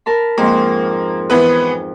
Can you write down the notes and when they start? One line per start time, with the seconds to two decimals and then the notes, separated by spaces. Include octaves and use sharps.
0.06 A#4 A5 B5
0.38 F2 G#2 F3 A#3
1.30 E3 B3 B4